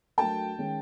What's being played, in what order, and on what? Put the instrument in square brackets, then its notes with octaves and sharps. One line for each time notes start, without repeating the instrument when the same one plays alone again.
[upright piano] F#3 A3 D4 F#4 A#4 [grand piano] G5 A5
[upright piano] D#3 G#3 C#4